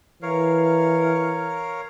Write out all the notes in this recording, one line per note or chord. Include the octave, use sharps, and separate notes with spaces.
E3 A#4 C#5 F5